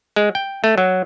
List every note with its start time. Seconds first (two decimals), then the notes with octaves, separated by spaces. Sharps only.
0.16 G#3
0.35 G5
0.64 A3
0.78 F#3